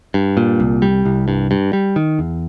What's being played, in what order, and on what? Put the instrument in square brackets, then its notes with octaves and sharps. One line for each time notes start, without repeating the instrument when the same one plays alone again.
[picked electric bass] G2
A#2
C2
G3
C2
G2
G2
G3
D#3
E2